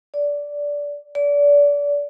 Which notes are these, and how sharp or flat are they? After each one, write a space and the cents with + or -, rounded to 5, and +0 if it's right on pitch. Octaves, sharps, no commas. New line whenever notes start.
D5 -15
D5 -30